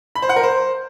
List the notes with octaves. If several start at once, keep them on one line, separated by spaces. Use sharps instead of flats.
B5
C5
F#5
A#4
C5